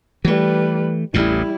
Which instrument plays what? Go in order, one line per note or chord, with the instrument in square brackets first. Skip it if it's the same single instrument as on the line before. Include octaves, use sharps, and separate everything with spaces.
[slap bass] E3 A3 [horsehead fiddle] G3 B4
[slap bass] A1 E2 A2 [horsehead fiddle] G3 E4